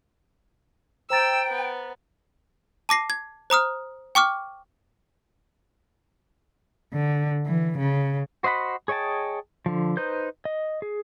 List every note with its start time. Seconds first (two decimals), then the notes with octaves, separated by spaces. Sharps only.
1.10 C5 G5 A#5 E6 A6
1.48 B3
2.89 A5 D6 A#6 C7
3.10 G#6
3.50 C5 A#5 D#6 F6
4.15 G5 C#6 D6 F6
6.93 D3
7.46 E3
7.78 C#3
8.43 F#4 C5 D#5 F#5 B5
8.88 G#4 C#5 D#5 G5 A5
9.66 D3 F3
9.97 D#4 B4 C5 G6
10.45 D#5
10.82 G#4